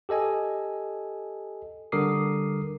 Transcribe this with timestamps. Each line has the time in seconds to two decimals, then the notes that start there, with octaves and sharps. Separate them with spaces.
0.09 G4 A4 D#5 G#5
1.92 D3 G3 A#4 D6 D#6 C7